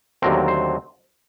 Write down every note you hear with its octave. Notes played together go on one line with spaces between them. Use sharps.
D#2 D3 F#3 A3 C4 A#4
C5